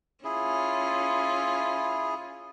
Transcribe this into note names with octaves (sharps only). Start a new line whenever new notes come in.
C#4 E4 F4 G#4